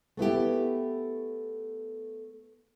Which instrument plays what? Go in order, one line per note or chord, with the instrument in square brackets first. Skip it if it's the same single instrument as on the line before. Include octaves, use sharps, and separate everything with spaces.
[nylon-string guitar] A3 B3 E4 G4